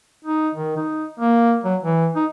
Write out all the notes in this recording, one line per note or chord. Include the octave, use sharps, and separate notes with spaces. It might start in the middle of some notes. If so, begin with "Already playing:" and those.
D#4
D#3
D#4
A#3
F#3
E3
D#4